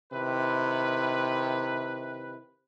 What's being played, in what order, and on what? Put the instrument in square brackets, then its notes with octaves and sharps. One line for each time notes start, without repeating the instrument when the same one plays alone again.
[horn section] C3 D#3 E4 B4